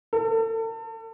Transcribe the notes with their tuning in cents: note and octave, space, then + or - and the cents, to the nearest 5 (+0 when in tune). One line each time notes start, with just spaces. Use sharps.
A4 +35